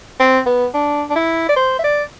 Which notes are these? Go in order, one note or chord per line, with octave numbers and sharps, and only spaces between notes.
C4
B3
D4
D4
E4
D5
C5
E5
D5